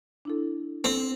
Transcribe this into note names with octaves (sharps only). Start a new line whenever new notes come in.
D4 E4 A4
C4 A4